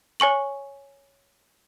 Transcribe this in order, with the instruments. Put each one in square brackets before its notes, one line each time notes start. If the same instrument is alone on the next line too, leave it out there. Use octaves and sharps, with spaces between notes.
[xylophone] C#5 G#5 C#6 F#7